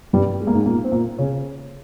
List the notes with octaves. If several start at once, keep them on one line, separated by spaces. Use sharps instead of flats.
G2 G3
G#3
A#3
G#2 G#3
A#2 A#3
C4
A#2 A#3
C#3 C#4